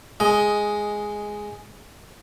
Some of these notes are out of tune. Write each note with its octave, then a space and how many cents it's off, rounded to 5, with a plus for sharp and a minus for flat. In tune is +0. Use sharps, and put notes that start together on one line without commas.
G#3 +0 D#5 +10